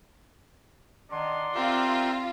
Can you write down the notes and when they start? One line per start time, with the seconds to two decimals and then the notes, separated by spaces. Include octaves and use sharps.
1.11 D#3 D4 D5 F#5 C6
1.55 C4 F4 G4 A#4 E5